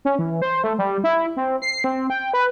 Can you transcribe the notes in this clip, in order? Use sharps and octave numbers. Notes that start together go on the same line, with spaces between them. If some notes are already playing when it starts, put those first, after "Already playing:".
C#4
E3
C5
A3
G3
E4
C4
C7
C4
G5
B4